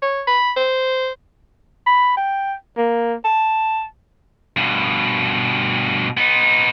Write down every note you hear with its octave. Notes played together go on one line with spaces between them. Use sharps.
C#5
B5
C5
B5
G5
A#3
A5
G2 B2
B3 D#4